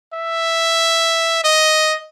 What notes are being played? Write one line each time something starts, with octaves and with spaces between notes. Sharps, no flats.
E5
D#5